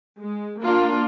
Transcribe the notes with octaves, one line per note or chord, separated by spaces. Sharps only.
G#3
A#3 D4 F4